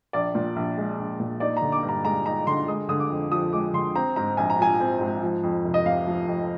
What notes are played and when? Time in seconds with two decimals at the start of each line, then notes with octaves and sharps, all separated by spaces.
0.13 A#1 D5
0.35 A#2
0.56 A#1
0.77 G#3
0.99 A#1
1.20 A#2
1.40 D#4 D5
1.57 D3 A#5
1.72 D6
1.83 G2
1.89 A#5
2.04 G#3 A#5
2.26 D#4 A#5
2.47 D3 C6
2.68 G#3 D#6
2.89 D3 D#6
3.00 D6
3.10 F2
3.31 F3 D#6
3.53 G#3 D6
3.74 D3 C6
3.95 C4 A#5
4.16 G#2 A#5
4.37 A#1 G#5
4.50 A#5
4.59 F3 G#5
4.80 C4
5.01 G#2
5.22 F3
5.43 F2
5.65 F1
5.74 D#5
5.86 C3 F5
6.07 F3
6.28 F2